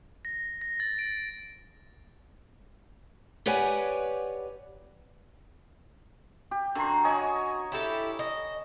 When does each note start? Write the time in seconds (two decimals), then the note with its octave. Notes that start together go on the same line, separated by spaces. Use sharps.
0.25 A#6
0.61 A#6
0.80 A6
0.99 D7
3.46 G4 B4 C#5 D5 F#5 G#5
6.51 G4
6.75 D3 F#4 A#5 C6
7.04 C#5 D#5 G#5
7.72 E4 G4 A4
8.19 D#5